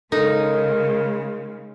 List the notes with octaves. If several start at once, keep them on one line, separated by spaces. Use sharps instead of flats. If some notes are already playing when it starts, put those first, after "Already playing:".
C#3 G#3 D#4 A4 A#4